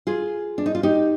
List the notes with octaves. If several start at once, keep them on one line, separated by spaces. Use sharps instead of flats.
F4 G#4
D4
D#4
F4
D#4 G4